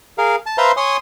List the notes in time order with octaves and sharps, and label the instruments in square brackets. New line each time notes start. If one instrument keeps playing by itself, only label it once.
[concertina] G#4 A#4 F5
A5
B4 C5 E5 F5 A#5 C6
C#5 G#5 C6 D#6